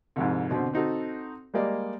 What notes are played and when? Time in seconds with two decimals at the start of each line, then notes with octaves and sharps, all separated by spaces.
0.16 C2 F2 G#2
0.51 B2 D3 C4
0.73 C4 D#4 F#4 A4
1.54 G3 G#3 A#3 D5 D#5